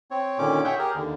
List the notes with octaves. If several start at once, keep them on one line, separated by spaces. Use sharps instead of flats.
C4 C#5
A#2 D3 D#3 C#4 D6
G#4 C#5 E5 F#5 G5
G4 G#4 A#4
D#2 D3